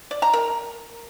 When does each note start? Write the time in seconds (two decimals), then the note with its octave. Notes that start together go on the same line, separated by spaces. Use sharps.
0.11 D5
0.22 A#5
0.34 A#4